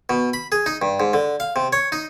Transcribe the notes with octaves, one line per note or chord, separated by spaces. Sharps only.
B2
B5
G#4
D#4
G2
G#2
D3
F5
C3
C#5
D#4